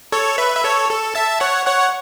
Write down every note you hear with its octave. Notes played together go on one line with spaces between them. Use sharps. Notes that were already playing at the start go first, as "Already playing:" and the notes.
A4 C#5
B4 E5
E5
A4 C#5
A4
E5 A5
C#5 F#5
C#5 F#5